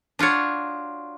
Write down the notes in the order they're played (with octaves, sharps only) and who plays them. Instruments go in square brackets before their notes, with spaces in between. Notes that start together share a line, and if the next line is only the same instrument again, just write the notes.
[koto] D4 F4 F#4 C#5